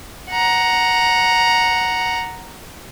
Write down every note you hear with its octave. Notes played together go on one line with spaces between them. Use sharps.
F#5 A#5